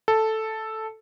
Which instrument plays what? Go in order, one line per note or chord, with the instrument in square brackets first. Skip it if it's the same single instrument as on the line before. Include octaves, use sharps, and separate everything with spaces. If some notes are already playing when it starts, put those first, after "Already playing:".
[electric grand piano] A4